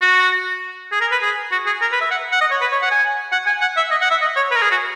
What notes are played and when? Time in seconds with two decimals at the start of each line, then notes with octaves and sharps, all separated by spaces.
0.02 F#4
0.92 G#4
1.01 A#4
1.12 B4
1.22 G#4
1.52 F#4
1.67 G#4
1.82 A#4
1.92 B4
2.01 E5
2.11 F#5
2.32 F#5
2.41 D#5
2.51 C#5
2.61 B4
2.72 C#5
2.82 F#5
2.91 G#5
3.32 F#5
3.46 G#5
3.61 F#5
3.77 E5
3.91 D#5
4.02 F#5
4.11 E5
4.21 D#5
4.36 C#5
4.51 B4
4.56 A#4
4.62 G#4
4.71 F#4